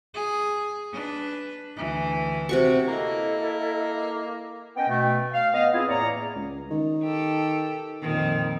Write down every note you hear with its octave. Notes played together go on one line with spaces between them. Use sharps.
G#4
D4 B4
D2 E3
C3 F#4 C#6
A#3 E4 A4 D#5
B3 C#4 D#5 G5
B2 A3
F5
B3 D#5 F5
B3 C4 E4 F4 G#4
E2 A2 A#3 C#5 D5 A#5
C#2
D#3
G4 A4
F2 A#2 D#3